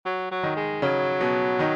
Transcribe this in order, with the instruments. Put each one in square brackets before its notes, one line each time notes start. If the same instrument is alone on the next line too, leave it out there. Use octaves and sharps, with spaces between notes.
[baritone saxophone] F#3
F#3
[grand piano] D#3 D#4
[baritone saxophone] G#3
[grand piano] C#3 C#4 [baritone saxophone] F#3
[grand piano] B2 B3
D#3 D#4